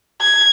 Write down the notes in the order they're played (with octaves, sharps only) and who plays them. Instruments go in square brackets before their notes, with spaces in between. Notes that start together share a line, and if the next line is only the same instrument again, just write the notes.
[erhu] G#6